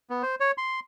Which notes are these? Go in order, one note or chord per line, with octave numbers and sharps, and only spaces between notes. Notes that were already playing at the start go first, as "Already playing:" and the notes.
B3
C5
C#5
C6